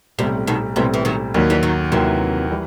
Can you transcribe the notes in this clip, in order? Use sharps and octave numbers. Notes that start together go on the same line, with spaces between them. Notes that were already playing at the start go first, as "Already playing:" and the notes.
B1 A2 C3 G3 C4
B2 D#3
B1 A2 C3 E3 G3 C4
E3
D#3 F#3
D#2 D#3 F#3 G3
E3 G3
D#3 F#3
D#2 C3 D#3 E3 F#3
E3 G3